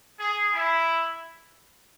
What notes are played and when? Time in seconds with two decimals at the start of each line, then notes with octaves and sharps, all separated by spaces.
0.18 G#4
0.53 E4